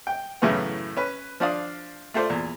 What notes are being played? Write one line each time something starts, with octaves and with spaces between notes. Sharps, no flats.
G5
F#2 A2 C#3 E3 A3 B3
C#4 B4
F3 D4 D5 F5 D#6
A3 F4 A4 C5 D5
E2 A#2